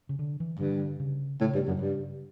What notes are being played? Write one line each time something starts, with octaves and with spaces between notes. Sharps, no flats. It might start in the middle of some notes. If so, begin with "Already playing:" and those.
C#3
D3
E3
G2 D3
C#3
A2 C#3
G2
F#2
G2